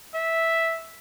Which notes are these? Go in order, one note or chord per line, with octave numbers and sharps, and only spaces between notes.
E5